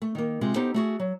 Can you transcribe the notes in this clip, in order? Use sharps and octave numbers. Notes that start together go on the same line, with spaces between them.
A3
D#3 A#3
C3 G#3 F4
B3 D#4 G4 A4 C5
A3 F#4 G#4
F#3